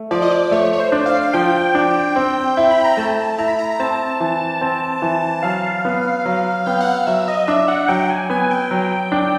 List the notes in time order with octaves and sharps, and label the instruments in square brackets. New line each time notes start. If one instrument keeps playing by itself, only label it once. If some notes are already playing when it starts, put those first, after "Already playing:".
Already playing: [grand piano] A3
[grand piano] F3 [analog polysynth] D5
[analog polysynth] D#5
D5
[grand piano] A3 [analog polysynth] C#5
[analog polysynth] C#5
C5
[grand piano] D4
[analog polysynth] F5
[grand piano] F3 [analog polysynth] G5
[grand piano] D4
C4
E4
[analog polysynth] B5
A#5
[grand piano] A3 [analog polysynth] A5
[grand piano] E4 [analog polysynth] A#5
[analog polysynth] B5
A#5
A#5
[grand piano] C4 [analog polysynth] A5
[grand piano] E3
C4
E3
[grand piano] F#3 [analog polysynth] F5
[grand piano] B3
F#3
[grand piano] B3 [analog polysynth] G5
[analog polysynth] F#5
F5
[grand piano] F#3 [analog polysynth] E5
[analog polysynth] D#5
[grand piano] D4 [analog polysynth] E5
[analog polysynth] F#5
[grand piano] F#3 [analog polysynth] G5
[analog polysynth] G#5
[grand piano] B3 [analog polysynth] G#5
[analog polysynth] G5
[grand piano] F#3
D4